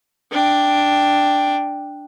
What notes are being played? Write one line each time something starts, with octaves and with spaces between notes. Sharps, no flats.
D4 G5